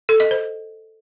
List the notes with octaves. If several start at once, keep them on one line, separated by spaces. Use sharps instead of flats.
A4
D#5
C5